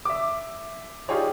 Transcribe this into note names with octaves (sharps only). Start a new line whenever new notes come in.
E5 D6
D#4 F4 G4 G#4 C#5 D5